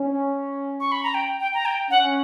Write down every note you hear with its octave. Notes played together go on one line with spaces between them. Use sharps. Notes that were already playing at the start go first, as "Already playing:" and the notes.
Already playing: C#4
C#6
B5
A#5
G5
G5
A#5
G5
C#4 F#5